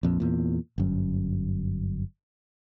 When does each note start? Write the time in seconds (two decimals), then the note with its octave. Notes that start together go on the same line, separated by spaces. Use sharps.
0.03 A#1 F2
0.20 E2 A#2
0.78 G1 F#2